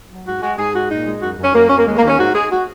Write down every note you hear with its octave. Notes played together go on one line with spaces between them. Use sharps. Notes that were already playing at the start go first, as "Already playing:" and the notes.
F#3
G#2 F#4
G#3 F#4
G#2 G#4
G#3 F#4
A#2 D#4
G#3
F#2 F#4
F#2
C#4
F#2 A#3
F#2 C#4
A#3
D#2 G#3
A#3
D#2
C#4
G#2 F#4
G#3 G#4
F#4